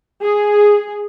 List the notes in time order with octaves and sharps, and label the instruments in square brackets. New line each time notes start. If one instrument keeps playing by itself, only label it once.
[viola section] G#4